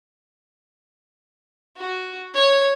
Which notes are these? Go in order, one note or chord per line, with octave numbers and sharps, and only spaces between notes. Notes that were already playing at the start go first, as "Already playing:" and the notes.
F#4
C#5